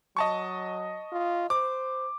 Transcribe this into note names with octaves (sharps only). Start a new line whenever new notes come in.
F#3 D#5 A5 C#6
F4
C5 D6